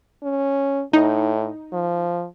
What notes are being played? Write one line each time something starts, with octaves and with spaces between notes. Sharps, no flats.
C#4
A2 D#4
F3